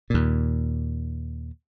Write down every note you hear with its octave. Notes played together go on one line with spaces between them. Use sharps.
D#2 A#2